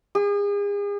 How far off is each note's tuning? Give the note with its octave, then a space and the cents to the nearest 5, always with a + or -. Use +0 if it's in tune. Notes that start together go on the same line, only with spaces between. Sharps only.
G#4 -40